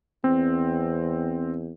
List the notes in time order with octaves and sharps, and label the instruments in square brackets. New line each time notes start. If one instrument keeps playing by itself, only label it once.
[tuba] E2 [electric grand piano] C4